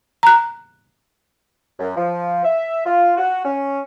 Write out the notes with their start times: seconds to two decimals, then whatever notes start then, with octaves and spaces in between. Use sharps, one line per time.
0.23 A#5 F#6
1.79 F#2
1.96 F3
2.44 E5
2.86 F4
3.17 F#4
3.45 C#4